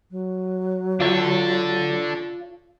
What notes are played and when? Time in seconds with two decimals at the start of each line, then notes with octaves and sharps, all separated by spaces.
0.11 F#3
1.00 D4 F4 A4 C#5